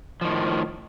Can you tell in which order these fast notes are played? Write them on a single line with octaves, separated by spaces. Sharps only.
F3 D#3 A2